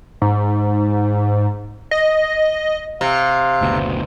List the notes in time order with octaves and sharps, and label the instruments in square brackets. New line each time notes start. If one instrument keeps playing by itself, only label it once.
[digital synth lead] G#2
D#5
[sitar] C3 [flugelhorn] F5
[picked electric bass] F#1 D2 B2